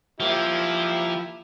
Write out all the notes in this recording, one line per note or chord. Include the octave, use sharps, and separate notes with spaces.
F3 A#3 E4 G4